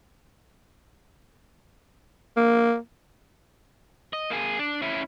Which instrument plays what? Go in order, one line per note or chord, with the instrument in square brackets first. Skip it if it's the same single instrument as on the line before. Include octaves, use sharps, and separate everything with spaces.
[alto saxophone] A#3
[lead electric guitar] D#5
A#3 G#4
D4
C#4 E4